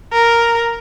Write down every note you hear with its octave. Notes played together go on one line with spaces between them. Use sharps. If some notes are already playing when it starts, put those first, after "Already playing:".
A#4